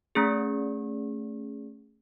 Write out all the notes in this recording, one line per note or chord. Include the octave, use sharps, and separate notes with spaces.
A3 C#4 G#4